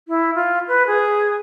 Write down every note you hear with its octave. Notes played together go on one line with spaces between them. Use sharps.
E4
F4
B4
G#4